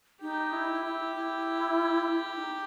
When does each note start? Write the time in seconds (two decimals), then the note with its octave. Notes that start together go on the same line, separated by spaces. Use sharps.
0.21 D#4 G4
0.53 E4
0.85 E4
1.16 E4
2.12 E4
2.35 D#4